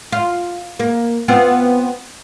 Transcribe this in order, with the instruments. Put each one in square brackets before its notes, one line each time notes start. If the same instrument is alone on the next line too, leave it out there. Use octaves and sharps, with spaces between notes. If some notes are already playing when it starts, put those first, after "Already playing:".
[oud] F4
A#3
B3 C4 F4